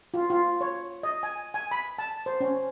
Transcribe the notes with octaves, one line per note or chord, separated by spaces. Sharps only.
F4
F4
C#5
D#5
G#5
G#5
B5
A5
C5
C#4